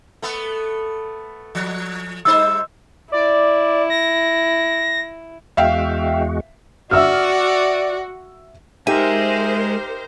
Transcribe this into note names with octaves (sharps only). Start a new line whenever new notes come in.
A3 B3
F3
G3 D#4 C5 E6
E4 D5
A#6
E2 G#3 F#4 E5 F5 G5
F#4 D5 E5 E6 F6
G#3 D#4 G4 A#4 C5 E5 G#5